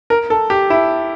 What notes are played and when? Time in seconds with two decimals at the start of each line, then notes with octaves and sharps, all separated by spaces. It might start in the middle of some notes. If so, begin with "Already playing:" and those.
0.10 A#4
0.30 A4
0.50 G4
0.70 E4